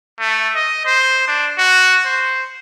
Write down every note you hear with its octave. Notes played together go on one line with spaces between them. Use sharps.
A3
D#5
C5
D4
F#4
C5